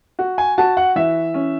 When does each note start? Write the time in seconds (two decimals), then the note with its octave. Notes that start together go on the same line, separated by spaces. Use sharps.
0.19 F#4
0.38 G#5
0.58 F#4 A5
0.77 F#5
0.96 E3 E5
1.34 C#4